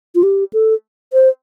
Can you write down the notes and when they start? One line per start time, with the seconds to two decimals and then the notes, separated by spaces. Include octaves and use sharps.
0.15 F4
0.23 G4
0.53 A4
1.13 C5